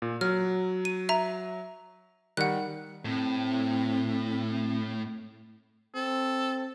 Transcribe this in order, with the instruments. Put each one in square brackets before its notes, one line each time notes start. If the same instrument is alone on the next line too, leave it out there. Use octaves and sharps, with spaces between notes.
[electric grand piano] A#2
[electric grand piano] F#3 [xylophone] F6
[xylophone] D#7
E5 A#5
[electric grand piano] D#3 G3 [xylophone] F#5 F#6
[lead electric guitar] A2 [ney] C4
[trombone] C4 [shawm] A4